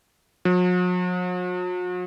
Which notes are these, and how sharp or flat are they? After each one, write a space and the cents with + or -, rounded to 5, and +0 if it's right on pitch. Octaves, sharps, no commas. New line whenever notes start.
F#3 -45